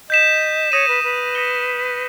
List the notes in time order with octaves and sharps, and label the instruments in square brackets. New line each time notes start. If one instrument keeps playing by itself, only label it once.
[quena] D#5 [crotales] G6 B6 E7
[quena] C#5 [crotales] D#6 A#6 D#7
[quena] B4
B4
[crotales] D#6 A#6 C#7 G7